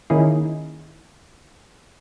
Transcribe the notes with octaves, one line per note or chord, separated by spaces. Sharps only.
D#3 A#3 C#4 D#4 E4 G#4